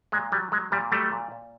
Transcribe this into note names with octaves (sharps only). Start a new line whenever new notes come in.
A#2 G#3
F#3 G3
F#3 G#3
A#2 G3
F#3 G3 A3
A#2
A#2